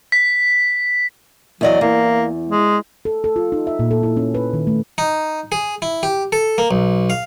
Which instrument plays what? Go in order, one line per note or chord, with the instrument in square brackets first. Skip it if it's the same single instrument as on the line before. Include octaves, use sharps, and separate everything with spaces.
[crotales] B6
[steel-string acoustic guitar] E2 D5 D#5 [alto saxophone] F#3
[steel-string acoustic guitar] E2 [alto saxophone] A#3
[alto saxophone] G#3
[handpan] A4
A4
F4
D#4
E5
A#2
A4
E4
C#4
B4
D#3
A3
[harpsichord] D#4
G#4
E4
G4
A4
A#3
B1
F5